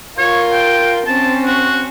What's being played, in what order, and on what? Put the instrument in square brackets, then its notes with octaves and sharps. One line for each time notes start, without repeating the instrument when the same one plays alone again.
[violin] F4 A#4 [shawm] C#5
[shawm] G5
[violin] C4 C#4 [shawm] A5
[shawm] F#4